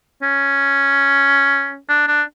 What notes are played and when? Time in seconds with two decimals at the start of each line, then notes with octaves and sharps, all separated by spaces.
0.22 C#4
1.89 D4
2.08 D4